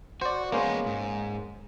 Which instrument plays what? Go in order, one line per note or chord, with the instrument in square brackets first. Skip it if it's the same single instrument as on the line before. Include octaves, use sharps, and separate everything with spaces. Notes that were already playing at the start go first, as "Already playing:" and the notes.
[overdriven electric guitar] F#4 [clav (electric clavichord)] C5 D5
[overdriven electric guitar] G#3 B3 [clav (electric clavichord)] A#3 C#4 C5
[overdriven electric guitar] G#2